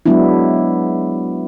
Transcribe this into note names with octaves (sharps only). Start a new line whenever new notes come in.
F#3 G#3 B3 D4 E4